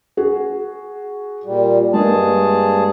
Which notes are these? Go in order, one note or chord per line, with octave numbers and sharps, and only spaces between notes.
F#4 G#4
A#2 G3
G2 G#3 A#3 G#4 A5